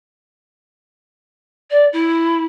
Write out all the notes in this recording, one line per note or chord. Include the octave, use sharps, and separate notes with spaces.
D5
E4